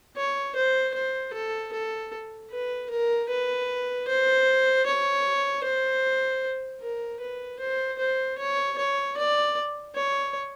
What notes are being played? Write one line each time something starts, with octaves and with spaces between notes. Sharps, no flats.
C#5
C5
C5
A4
A4
B4
A#4
B4
C5
C#5
C5
A#4
B4
C5
C5
C#5
C#5
D5
C#5